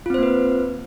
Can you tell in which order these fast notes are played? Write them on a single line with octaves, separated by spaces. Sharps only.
F4 C4 C5 A#3 B4